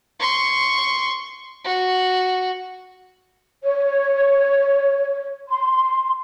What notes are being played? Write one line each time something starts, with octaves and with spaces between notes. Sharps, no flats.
C6 C#6
F#4
C#5
C6